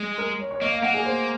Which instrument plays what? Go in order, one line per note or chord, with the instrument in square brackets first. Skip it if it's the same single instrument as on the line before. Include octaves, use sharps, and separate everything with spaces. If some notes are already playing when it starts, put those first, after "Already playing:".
Already playing: [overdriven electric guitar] G#3
[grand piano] A#4
C#5
C#5
[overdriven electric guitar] A#3 [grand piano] D#5
[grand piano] F5
[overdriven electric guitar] A#3 [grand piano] F#5
[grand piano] G#4
C5